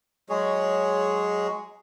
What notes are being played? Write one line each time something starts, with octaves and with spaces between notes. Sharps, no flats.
F#3 G#3 G#4 C#5